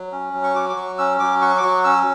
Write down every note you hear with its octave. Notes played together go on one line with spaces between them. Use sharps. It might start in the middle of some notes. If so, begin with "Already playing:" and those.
Already playing: F#3
C#4
F#3
C#6
F#4 D6
D6
F#3 C#6
C#4 E6
F#3 D6
F#4 C#6
D6
F#3 C#6
C#4 E6